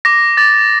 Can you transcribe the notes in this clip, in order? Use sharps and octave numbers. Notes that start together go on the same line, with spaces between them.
D6 A#6
D6 A6